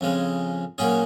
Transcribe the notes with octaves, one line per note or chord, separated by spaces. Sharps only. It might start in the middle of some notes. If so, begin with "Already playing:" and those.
F2 C#3 G#3
A#2 F#3 C#4 G#4